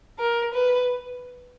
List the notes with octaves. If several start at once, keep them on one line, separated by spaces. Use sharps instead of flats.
A#4
B4